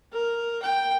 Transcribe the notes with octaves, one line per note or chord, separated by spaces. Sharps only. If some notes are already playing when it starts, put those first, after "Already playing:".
A#4
G5